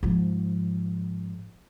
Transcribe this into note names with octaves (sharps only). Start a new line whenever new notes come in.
G#2 F3